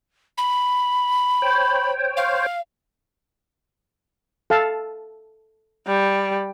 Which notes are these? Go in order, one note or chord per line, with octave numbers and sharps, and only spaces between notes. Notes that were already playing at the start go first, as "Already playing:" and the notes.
B5
C5 C#5 G5
F5
A4 F5 A5
G3